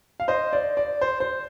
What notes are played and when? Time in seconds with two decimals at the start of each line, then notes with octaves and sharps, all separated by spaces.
0.20 F5
0.28 C5 D#5
0.53 D5
0.77 D5
1.01 C5
1.20 C5